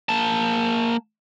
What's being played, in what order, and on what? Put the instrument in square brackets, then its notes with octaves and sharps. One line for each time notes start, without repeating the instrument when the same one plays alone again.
[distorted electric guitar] A#3 A5